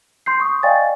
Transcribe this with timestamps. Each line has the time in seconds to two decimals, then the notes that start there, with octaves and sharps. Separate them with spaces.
0.26 C6 G6 C7
0.40 C#6 D#6
0.63 D5 D#5 F5 G5 G#5 A6